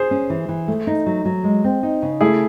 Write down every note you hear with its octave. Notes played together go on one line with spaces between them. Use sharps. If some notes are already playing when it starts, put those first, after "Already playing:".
Already playing: G#4 C5
C#4
E3
E3
A3
D#4
F#3
F#3
G#3
C4
D#4
C#3
A3 E4 G#4